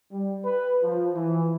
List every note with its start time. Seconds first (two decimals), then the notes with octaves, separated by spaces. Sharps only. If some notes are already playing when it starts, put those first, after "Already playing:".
0.12 G3
0.45 B4
0.83 F3
1.14 E3